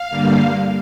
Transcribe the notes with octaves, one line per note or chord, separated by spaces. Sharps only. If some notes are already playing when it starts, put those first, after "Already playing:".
Already playing: F5
G2 D3 G3 A#3